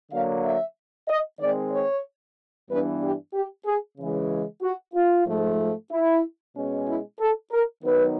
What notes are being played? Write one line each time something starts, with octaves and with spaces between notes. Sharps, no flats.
D3 F#3 A#3 F5
E5
D#5
D#3 G#3 C4 D5
C#5
G2 E3 G3 B3 D4 B4
G4
G4
G#4
C#3 E3 G#3
F#4
F4
G#2 F3 A3
E4
B2 G#3 C#4
E4
A4
A#4
D#3 F#3 B3 D#4 B4